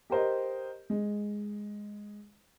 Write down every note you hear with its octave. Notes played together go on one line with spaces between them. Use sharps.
G4 A#4 C5 D#5
G#3